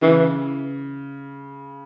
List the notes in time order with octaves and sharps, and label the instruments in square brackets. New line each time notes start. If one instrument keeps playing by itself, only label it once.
[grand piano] C#3 [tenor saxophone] E3